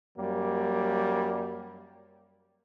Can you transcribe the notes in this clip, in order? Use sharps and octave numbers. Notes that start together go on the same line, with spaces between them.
F#2 G3 A#3